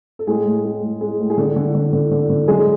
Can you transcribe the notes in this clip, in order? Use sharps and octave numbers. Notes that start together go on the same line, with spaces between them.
A4
A2 G#3 G#4
A2
G#3
A2
G#3
A2
G#4
D3 A3 A4
D3
D3
D3
D3
D3
F#3 G#3 G#4